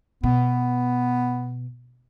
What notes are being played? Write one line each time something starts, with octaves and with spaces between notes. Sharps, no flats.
B2 B3